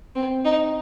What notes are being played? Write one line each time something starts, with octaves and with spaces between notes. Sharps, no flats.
C4
D#4